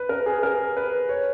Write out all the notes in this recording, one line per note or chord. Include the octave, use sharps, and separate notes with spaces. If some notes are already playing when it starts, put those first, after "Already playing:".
Already playing: B4
A#4
G#4
A#4
B4
C#5